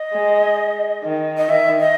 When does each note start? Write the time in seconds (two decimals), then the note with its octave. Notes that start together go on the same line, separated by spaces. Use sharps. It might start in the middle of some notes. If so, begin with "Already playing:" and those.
Already playing: D#5
0.13 G#3
1.04 D#3
1.37 D#5
1.49 D#3 E5
1.80 D#5